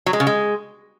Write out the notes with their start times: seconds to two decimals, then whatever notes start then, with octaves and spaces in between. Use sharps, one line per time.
0.06 F#3
0.13 G#3
0.20 C#3
0.27 G#3